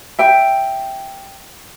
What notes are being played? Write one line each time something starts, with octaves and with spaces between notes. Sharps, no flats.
E5 G5